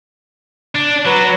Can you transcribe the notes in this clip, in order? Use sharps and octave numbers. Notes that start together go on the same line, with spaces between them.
D4
F#3 B4